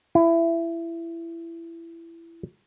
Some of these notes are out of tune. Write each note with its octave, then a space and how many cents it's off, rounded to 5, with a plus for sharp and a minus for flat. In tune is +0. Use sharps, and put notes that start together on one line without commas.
E4 +20